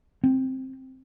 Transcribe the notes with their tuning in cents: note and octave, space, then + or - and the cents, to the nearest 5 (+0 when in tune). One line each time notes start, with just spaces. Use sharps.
C4 +5